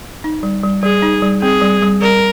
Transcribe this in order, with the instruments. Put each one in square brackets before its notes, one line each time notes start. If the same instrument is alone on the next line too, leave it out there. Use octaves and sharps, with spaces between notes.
[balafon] D#4
G3
G3
[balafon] G3 [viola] G#4
[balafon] D#4
G3
[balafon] C4 [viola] G#4
[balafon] G3
G3
[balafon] G3 [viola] A#4